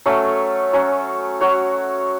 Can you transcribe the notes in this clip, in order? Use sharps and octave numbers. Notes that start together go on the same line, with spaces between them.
F#3 A3 C#4
F#3 C#4 F#4
F#3 C#4 F#4 C#5